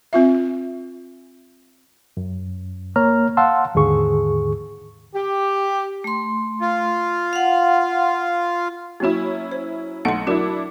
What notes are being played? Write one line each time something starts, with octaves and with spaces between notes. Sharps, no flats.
C4 F4 E5
F#2
A#3 C#5 A#5 F6
F5 F#5 A5 C6 E6
D#2 G#2 D3 G#4 C#6
G4
A3 C6
F4
F5 F#5
F#3 A#3 C#4 E4 F#4
C5
B1 A3 F#5 C6 C#7
F#3 D4 E4 F#4 A#4